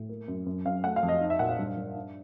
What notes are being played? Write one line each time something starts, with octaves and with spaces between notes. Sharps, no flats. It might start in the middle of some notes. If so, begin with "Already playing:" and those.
Already playing: A2
A#3
F#2
F#2
F#2 F5
A3 F#5
F5
F2
D#5
D#4
E5
A#2 F#5
F5
G2
G2
D4